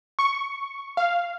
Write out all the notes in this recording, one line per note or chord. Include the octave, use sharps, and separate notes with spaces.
C#6
F5